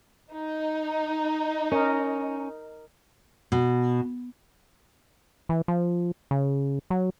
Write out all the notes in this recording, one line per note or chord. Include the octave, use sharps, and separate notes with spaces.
D#4
C#4 A#4 D#5
B2
E3
F3
C#3
F#3